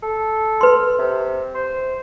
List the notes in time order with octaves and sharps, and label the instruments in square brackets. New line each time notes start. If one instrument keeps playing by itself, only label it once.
[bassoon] A4
[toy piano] B4 C6
[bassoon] C3
C5